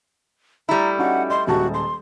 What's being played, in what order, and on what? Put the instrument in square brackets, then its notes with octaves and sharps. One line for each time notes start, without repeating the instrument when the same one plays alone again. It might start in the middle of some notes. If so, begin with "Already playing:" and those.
[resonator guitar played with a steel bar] G3 A3 E4 [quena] A#5
[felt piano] C#4 D#4 F#4 [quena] F#5
[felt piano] D#5 [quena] C6
[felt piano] D#1 G#3 A5 [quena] F#4
[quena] C6